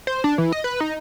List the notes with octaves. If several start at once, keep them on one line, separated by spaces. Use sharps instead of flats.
C5
D4
E3
D#5
B4
D#4